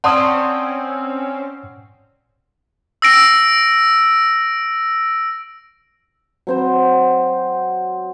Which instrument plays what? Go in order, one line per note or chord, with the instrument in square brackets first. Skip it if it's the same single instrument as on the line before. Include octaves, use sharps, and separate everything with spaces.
[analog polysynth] C4 C#4 [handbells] D5 A5 [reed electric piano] F#5 C6 D#6
[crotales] E6 A#6 D7
[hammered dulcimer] F#3 C4 C5